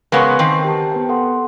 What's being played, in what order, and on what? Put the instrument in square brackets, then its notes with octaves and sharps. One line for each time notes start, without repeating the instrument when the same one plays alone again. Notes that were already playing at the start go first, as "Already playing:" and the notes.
[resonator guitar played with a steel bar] C#3 G#3 B3 [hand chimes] A#4 C6 C#6
[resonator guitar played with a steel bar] D#3 C4
[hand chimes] G4 A5
B3 B4 G5
A4 F#5 C6